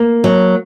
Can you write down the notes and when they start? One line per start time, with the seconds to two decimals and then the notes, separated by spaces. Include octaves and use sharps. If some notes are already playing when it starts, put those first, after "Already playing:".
Already playing: A#3
0.24 F#3